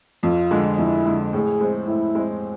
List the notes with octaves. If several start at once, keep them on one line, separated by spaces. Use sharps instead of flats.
F2 F4
D3 G#3
F2 E4
D3 G#3
A2 G#4
G#3 C4
A2 E4
G#3 C4